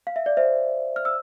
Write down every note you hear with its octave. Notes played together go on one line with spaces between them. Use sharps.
F5
E5
D5
C5 E5
F6
E6